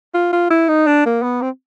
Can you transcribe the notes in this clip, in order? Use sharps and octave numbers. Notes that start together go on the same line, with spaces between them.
F4
F4
E4
D#4
D4
A#3
B3
C4